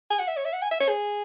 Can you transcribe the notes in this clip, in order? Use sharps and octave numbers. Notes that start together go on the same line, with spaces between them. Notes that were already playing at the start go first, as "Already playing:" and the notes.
G#5
F#5
E5
C#5
E5
F#5
G#5
E5
C#5
G#4